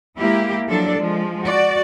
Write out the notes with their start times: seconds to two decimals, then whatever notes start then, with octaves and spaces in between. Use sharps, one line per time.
0.17 G#3 A#3 E4 G4
0.69 F3 F#3 D4 A4 D5
0.98 F3 G#3
1.44 F#4 D5